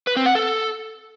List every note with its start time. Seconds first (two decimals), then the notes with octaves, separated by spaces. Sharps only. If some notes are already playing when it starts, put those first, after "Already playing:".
0.07 B4
0.16 C4
0.26 F#5
0.35 A4